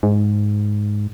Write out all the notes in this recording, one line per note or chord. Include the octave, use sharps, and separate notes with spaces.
G#2